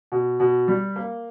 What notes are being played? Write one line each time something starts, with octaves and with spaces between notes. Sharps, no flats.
B2
B2
G3
A#3